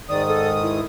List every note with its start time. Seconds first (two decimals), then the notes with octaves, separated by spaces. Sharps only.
0.09 G#2 D#3 D5 D#6
0.27 A4
0.61 E4